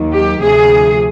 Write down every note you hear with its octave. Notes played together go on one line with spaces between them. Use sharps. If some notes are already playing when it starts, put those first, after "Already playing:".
Already playing: D#2 D#3 F#3
G4
D2 C3 F3 A3 G#4